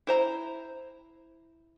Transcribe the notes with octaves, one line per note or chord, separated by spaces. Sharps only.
E4 C5 A#5